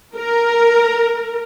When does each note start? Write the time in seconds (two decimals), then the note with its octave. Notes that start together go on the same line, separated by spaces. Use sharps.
0.17 A#4